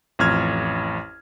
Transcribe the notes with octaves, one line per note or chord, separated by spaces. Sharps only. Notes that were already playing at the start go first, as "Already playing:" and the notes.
A1 F2 F6 G#6